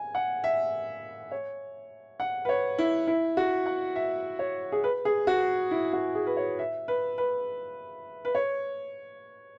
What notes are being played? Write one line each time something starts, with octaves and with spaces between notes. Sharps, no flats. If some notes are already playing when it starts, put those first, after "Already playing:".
Already playing: G#5
F#5
E5
C#5
F#5
B4
C#5
E4
E4
F#4
F#5
E5
C#5
G#4
B4
G#4
F#4
E4
F#4
G#4
B4
C#5
E5
B4
B4
B4
C#5